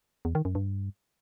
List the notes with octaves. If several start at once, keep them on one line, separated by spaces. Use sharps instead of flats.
E2
D#3
F#2
G2